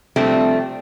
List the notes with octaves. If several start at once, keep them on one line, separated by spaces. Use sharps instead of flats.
C3 F3 G3 A3 C4 D4